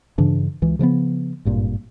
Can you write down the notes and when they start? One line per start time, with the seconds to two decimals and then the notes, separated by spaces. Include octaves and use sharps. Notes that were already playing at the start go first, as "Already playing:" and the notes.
0.18 G2 C#3 E3 D4
0.62 C#2 E3
0.79 C#3 F3 F#3 B3
1.45 G#1 G2 A#2